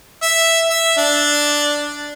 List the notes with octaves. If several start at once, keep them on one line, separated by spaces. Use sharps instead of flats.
E5
E5
D4